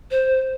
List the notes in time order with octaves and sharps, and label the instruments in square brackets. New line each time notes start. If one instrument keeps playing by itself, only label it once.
[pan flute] C5